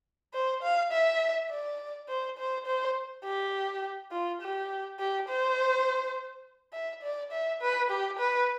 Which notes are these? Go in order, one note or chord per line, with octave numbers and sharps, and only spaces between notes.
C5
F5
E5
D5
C5
C5
C5
G4
F4
G4
G4
C5
E5
D5
E5
B4
G4
B4